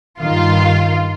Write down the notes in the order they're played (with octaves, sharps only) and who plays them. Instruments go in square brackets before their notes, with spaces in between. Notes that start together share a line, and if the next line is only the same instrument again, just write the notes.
[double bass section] G2 D#3 [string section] F4